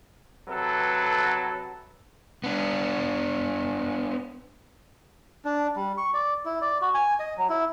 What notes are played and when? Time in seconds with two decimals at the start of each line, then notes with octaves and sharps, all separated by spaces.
0.46 C3 F#3 A4 B4
2.44 B3 D4
5.45 D4
5.76 G3
5.97 C#6
6.14 D5
6.45 E4
6.62 D5
6.82 F#4
6.94 G#5
7.20 D#5
7.38 F#3
7.49 E4